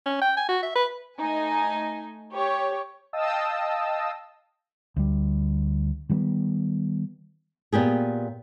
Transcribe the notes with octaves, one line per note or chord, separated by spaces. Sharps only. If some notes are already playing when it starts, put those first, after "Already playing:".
C#4
G5
G#5
F#4
E5
B4
A3 D#4 G#5
G4 C#5
D#5 F5 G5 A5 D#6 E6
D2 G3
D#3 G3 A3 B3
A#2 B3 G4 G#4